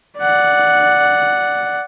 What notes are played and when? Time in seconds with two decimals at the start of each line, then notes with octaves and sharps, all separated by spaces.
0.19 D5 F#5